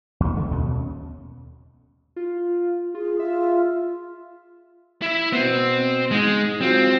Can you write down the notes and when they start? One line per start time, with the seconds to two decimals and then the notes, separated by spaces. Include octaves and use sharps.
0.20 D#2 A3
0.35 C#2 D3 F3 A3
0.51 D#2 B2 C#4
2.16 F4
2.95 F4 G#4
3.20 F4 E5
5.02 E4 E5
5.32 B2 B3 C4
6.11 G#2 G#3 D#4
6.61 F#3 C4 F4